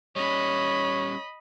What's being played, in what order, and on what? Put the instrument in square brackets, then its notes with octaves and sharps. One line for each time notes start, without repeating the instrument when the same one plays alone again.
[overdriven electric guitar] G3 C#4 [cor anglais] C#5 [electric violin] D#5 B5